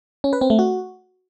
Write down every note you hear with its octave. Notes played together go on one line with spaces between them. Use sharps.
C#4
B4
C4
A3
F#4